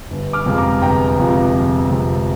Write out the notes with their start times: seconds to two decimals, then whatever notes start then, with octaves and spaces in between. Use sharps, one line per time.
0.10 G1
0.33 D6 F6
0.46 F2 C3 F3 G#3
0.58 A#5 D6
0.81 G1 G5 A#5
1.18 F2 C3 F3 G#3
1.53 G1
1.90 F2 C3 F3 G#3